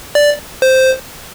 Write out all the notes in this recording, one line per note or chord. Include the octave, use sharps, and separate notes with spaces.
D5
C5